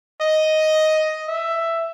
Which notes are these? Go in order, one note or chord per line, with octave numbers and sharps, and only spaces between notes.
D#5
E5